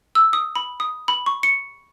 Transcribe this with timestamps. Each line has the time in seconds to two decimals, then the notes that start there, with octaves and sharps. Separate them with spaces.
0.15 E6
0.33 D#6
0.56 B5
0.80 D#6
1.08 B5
1.26 C#6
1.43 C#7